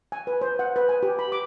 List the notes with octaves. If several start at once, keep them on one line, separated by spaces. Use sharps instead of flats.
G#5
B4
C5
F#5
B4
G#5
G4
B5
D6